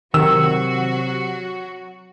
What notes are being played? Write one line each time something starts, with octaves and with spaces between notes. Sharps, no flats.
C3 D#3 F#3 F#4 E6